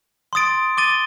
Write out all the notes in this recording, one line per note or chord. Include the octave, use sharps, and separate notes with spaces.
C6 D#6 A6 D7
D6 A6 D#7 G7